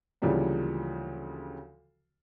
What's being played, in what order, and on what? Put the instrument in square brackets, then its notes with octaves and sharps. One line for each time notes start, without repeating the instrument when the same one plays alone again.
[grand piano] D2 C#3 E3 F3 G3 A#3